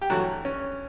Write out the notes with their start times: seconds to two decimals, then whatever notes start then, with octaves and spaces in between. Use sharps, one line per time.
0.01 G4
0.10 G2 E3 F#3 A3 F#4
0.45 C#4